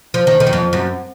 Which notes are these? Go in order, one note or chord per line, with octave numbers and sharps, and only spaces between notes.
F3
D#3
D#3
F#2
F2
F#2